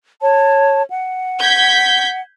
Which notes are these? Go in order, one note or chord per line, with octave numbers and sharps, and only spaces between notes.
C#5 A5
F#5
G6 G#6 B6